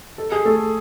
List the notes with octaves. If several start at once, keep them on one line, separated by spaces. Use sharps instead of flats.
A4
G#4
A3 A4